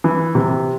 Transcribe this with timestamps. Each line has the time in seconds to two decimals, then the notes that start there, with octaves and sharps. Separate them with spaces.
0.04 E3
0.35 C3